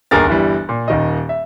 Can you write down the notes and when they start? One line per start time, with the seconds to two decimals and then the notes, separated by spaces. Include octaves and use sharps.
0.11 G1 D#2 G#4 A#4 A6
0.28 G1 E3 G3
0.69 A#2
0.88 D#1 D#3 D#5
1.29 E5